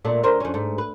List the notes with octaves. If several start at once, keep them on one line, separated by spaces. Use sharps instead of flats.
A#2 A3 D4
D2 A#4 C5
F2 C#4
G#2 A3
B4